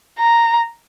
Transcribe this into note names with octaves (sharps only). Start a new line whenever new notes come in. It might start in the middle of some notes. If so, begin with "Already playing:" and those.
A#5